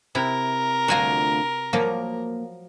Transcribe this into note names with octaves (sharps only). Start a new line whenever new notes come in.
C3 E4 A#4
D2 F4 F#4 G#5 A#5
F3 F#3 A#3